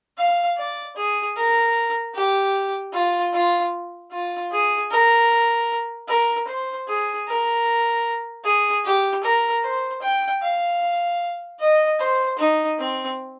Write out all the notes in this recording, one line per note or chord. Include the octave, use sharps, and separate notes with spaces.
F5
D5
G#4
A#4
G4
F4
F4
F4
G#4
A#4
A#4
C5
G#4
A#4
G#4
G4
A#4
C5
G5
F5
D#5
C5
D#4
C4